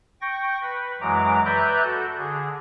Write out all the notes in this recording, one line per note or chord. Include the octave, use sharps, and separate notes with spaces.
G5 C#6 A#6
B4 B5
F#2 E3 F#3 G#3 A#5 D6
B4 D5 E5 A#5 F#6 G6
F#4 A4
D3 G#4